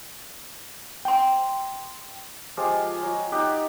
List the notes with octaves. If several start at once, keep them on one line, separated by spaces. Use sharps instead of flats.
G5 C6
F3 G#3 F4 G4
F#3
D#4 G4 D5 F#5